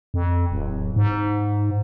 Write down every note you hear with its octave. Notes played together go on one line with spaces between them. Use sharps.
F2
D1
G#2